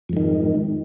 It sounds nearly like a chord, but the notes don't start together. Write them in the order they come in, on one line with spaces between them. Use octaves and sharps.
F2 G#2 D#3